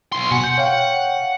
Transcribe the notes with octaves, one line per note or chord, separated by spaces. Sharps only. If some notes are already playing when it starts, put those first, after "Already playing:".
B1 C6
B2 F#5 G#5 C6
G6
C#5 F5 G5